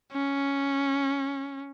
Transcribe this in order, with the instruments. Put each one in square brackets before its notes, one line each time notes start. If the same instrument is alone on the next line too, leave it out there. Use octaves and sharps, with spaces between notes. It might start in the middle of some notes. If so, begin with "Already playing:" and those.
[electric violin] C#4